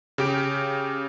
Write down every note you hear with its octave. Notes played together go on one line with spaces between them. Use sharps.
C#3 G4 D7